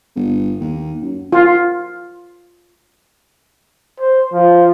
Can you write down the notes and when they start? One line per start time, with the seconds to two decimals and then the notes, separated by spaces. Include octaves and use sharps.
0.16 G1
0.61 D#2
1.02 F#2
1.32 F4
4.00 C5
4.33 F3